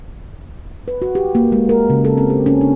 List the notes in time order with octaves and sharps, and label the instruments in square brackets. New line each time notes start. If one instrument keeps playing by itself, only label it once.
[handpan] B4
F#4
G4
A#3
G#3
A#4
C#3
A4
C4
G4
C#4
D4